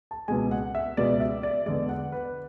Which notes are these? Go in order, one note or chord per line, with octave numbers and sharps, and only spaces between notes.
A5
C#2 B2 G#3 G#5
F#5
E5
C#2 B2 G#3 D5
E5
D5
E2 D3 G#3 D5
F#5
B4